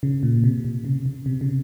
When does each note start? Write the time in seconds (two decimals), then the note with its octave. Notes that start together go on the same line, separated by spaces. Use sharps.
0.03 C#3
0.23 A#2
0.44 C3
0.64 C3
0.85 C#3
1.06 C#3
1.26 C3
1.41 C#3